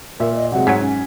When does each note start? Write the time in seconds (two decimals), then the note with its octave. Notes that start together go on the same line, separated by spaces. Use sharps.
0.20 A#2 A#4 E5
0.36 D#5
0.52 C3 F#3 G#3 F#5
0.67 G#2 F#3 G#6 B6
0.81 C#4